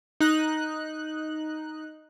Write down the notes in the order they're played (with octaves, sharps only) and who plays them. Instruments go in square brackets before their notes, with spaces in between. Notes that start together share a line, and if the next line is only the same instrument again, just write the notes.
[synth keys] D#4 F#6